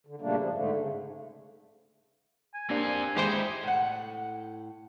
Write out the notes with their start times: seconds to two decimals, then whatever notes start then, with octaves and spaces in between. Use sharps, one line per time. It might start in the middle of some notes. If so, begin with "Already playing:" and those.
0.07 D3
0.21 A#2 C#3 G3 A3 A#3 D4
0.38 F#2 F3
0.53 G#2 D3 A3
0.76 C#3
2.55 G#5
2.70 A#3 C4 D4 G4 F5
3.16 G#3 D#4 E4 G4 C5 G5
3.63 A2 F#5